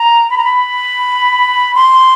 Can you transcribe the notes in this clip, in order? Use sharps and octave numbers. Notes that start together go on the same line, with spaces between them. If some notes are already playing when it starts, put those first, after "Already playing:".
Already playing: A#5
B5
A#5
B5
C6